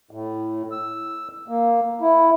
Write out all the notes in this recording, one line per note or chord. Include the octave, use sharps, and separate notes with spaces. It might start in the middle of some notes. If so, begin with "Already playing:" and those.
A2
E6
A#3
E4